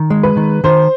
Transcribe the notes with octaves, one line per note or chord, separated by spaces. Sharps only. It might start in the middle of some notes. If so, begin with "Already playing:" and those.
Already playing: D#3
G#3
B4
D#3
D#3 C5